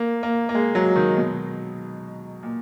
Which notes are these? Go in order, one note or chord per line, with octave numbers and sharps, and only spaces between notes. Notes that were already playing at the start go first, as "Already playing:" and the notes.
Already playing: A#3
A#3
A#3
G#3
F#3
D#3
B2
A#2